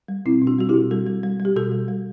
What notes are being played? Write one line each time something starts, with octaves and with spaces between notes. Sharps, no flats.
G3
B2 C4 E4
B2
D4 F#4
G3 F#4
B2 E4 G4
G3 F#4 A4
G3
G3
G3
G4
B2 F#4 A4
G3
G3